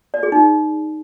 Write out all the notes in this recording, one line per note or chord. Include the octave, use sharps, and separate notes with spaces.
D5
G#4
D#4